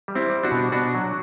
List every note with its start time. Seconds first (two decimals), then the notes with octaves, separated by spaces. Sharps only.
0.08 G3
0.15 C4 E4
0.29 G3
0.43 D4 F#4
0.51 B2
0.72 B2 D4 F#4
0.95 F#3